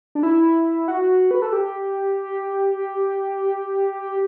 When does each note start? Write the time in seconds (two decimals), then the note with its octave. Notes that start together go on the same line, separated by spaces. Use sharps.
0.15 D4
0.23 E4
0.88 F#4
1.31 B4
1.42 A4
1.53 G4